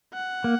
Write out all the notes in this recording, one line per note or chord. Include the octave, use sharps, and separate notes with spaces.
F#5
A#3